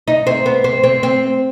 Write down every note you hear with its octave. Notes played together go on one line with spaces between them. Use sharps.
D#4
C4
B3
C4
C4
C4